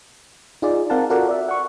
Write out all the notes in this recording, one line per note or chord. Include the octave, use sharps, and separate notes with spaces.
D#4 F4 G#4 D5
C4 A#4 F5 F#5 A5
F4 F#4 A4 A#4 D5 F#5
D5 E5
F#5 C#6